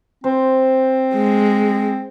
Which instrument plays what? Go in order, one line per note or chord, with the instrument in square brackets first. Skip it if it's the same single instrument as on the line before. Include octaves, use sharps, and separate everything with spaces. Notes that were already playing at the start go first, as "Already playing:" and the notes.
[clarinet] C4 [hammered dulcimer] C5
[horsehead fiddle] G#3